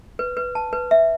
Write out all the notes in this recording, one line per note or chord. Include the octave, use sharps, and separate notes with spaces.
B4
B4
A5
B4
E5